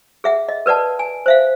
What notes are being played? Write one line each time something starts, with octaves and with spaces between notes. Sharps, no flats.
G#4 E5 F#5
D#5
A#4 B4 D5 F#5 A5
G#5
C5 E5 F5